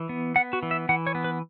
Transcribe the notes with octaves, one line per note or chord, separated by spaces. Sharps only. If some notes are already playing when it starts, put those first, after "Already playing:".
Already playing: E3
B3
B3 F#5
F#4
E3
E5
E3 F#5
C#5
B3
B4